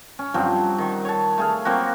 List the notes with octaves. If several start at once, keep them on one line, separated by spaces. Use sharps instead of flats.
C#4
G2 F3 F#3 C4
D#3
C#5 A5
A3 G#4 F5
F#3 A#3 C4 F#4